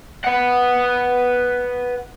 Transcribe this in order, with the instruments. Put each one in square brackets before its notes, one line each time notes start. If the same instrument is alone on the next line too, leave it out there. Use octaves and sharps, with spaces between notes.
[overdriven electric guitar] B4 F#5